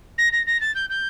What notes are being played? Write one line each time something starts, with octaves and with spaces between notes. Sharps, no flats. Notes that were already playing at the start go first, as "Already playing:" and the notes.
A#6
A#6
A#6
A6
G6
G6